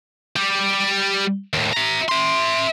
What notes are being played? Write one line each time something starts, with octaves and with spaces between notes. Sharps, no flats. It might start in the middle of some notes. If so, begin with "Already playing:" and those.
G3 G4
D#2 A2
E5 A#5
E5 C6